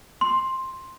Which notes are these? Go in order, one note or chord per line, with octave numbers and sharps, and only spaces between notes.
C6